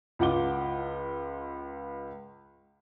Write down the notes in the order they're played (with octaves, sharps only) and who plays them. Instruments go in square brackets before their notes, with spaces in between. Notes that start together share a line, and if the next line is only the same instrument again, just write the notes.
[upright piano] C#2 F4 F#5 D6 G7